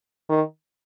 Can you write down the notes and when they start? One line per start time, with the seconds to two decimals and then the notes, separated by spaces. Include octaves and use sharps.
0.29 D#3